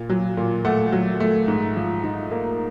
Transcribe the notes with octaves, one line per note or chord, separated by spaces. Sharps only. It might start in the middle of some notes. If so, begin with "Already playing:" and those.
Already playing: A#2
F#3
A#2
A3 F#5
F#3
A3
G#2
F3
D#4
A#3